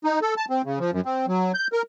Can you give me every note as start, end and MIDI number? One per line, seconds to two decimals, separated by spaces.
0.04 0.19 63
0.22 0.34 69
0.37 0.45 81
0.50 0.62 60
0.65 0.79 49
0.80 0.91 53
0.93 1.01 42
1.05 1.26 60
1.28 1.52 54
1.54 1.67 91
1.73 1.82 70